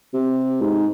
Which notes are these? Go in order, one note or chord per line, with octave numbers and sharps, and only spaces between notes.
C3
G#2